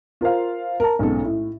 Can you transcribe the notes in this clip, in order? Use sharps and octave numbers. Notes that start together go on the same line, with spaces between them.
F4 A#4 C5 F5
A#4 A5
B1 G#2 C#4 A4
A2